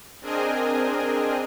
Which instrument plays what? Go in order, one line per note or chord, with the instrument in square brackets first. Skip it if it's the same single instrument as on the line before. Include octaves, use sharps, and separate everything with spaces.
[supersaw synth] C4 D4 G#4 A#4 D#5 G#5